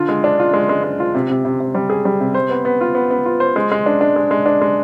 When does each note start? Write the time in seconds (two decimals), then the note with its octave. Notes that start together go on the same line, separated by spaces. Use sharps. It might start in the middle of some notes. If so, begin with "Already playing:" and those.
Already playing: D3 F4
0.09 G#3
0.24 D4
0.39 F4
0.53 G#3
0.69 G#3
0.84 G#3
1.00 F4
1.15 C3
1.30 C3
1.45 C3
1.60 C3
1.75 G3
1.90 G#4
2.05 G3
2.21 C3
2.35 C5
2.50 B3
2.65 B3
2.81 F4
2.95 B3
3.11 B3
3.25 F4
3.40 C5
3.56 G#3
3.71 G#3
3.86 D4
4.01 D4
4.16 G#3
4.31 G#3
4.46 D4
4.61 G#3